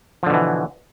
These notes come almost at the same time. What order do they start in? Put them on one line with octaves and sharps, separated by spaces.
F3 D3 B2 E3